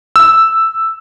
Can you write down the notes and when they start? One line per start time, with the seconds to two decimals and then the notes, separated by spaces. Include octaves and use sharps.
0.16 E6